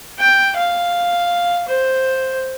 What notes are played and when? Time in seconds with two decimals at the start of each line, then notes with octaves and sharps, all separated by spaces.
0.19 G5
0.56 F5
1.68 C5